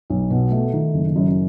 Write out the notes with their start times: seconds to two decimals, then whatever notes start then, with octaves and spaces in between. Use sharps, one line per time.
0.10 B1
0.30 B2
0.51 A3
0.73 D#3
0.94 F#1
1.16 F#2